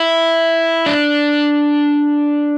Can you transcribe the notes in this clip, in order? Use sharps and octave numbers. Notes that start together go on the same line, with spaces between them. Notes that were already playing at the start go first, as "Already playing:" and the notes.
Already playing: E4
D4